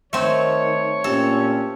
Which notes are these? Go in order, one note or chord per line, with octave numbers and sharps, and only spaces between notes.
D#3 A3 C4 C#5
A#2 C4 C#4 G4 A4